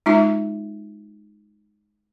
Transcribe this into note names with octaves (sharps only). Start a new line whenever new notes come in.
G#3 D#4 F4 E5